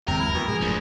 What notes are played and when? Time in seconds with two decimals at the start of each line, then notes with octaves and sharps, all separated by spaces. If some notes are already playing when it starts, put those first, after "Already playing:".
0.08 F#1 D#2 C3 G#3 A#4
0.20 E4
0.34 D2 B2 E3
0.48 G#2 C3 F3 G#4
0.61 F1 D2 F3